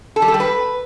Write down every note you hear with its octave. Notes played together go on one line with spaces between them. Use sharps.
A4
G3
A4
G3
B4